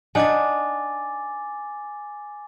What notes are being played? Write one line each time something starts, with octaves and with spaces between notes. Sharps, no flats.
D4 D#4 F#5 G#5 D6 A6